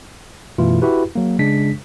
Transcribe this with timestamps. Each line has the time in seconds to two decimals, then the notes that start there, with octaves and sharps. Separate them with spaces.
0.58 F#2 B2 E3 A3 E4 F4
0.82 E4 F#4 G4 B4
1.15 F#3 A#3
1.39 C#3 G#3 D4 B6